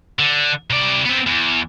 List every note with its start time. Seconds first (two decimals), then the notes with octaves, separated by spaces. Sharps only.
0.19 D3
0.70 C3 D5
1.05 B3 C4
1.27 E2